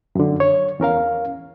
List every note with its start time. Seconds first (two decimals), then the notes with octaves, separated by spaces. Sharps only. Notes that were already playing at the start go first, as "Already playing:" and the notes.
0.15 F#2 D3
0.40 C#5
0.80 E2 C#4 A#4 F5